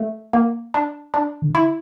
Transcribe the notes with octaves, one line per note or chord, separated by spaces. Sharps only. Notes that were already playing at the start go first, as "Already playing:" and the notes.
Already playing: A3
A#3
D4
D4
D3
E4